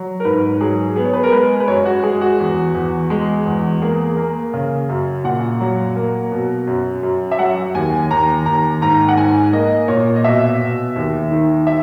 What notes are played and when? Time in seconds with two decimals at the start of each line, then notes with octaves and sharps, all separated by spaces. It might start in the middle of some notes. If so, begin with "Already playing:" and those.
Already playing: F#3
0.20 A#4
0.25 G#2 B4
0.61 F#3 G#4
0.96 B3 G#4
1.05 C#5
1.13 B4
1.23 A#4
1.32 G#3 B4
1.60 B4
1.68 F#2 C#5
1.85 F#4
2.03 G#3 G#4
2.21 F#4
2.39 E2
2.74 E2
3.10 G#3
3.45 E2
3.82 A#3 G#4
4.17 A#3
4.53 C#3
4.89 F#2
5.24 A#2 F#5
5.60 F#3
5.96 A#3
6.32 B2
6.67 F#2
7.03 F#2
7.32 E5
7.39 F#3 F#5
7.74 D#2 G#5
8.10 D#2 A#5
8.46 D#2 A#5
8.81 G#2 A#5
9.08 F#5
9.17 G#2 G#5
9.53 A#3 D#5
9.88 A#2 C#5
10.16 D#5
10.24 B2 E5
10.60 B2
10.96 D#2
11.31 D#3
11.67 E5